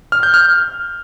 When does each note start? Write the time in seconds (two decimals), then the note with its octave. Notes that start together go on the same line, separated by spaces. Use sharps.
0.12 F6
0.23 G6
0.34 F6